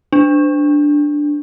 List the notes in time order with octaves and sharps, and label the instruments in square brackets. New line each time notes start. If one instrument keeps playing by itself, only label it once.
[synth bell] D4